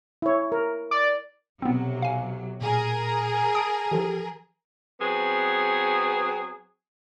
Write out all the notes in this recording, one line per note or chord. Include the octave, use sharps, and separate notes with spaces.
E4 C#5
A#4
D5
B1 C3 F#3 B3 C4
F5 G#5
A#2 G#4 A#4
A5 D#6 D7
E3 F3 G4 A4
F#3 B3 C4 G#4